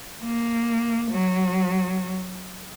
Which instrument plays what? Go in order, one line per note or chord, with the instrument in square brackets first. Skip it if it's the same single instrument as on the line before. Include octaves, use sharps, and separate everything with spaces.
[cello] A#3
F#3